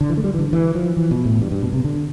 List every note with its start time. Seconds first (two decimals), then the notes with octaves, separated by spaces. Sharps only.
0.01 D3
0.10 E3
0.17 A3
0.24 G3
0.34 E3
0.39 D3
0.53 E3
0.75 F3
0.97 E3
1.11 B2
1.25 A2
1.41 G2
1.51 G2
1.62 B2
1.73 C3
1.84 D3